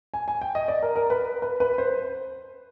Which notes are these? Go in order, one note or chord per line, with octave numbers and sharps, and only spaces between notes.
G#5
G#5
G5
D#5
D5
A#4
A#4
B4
B4
B4
C5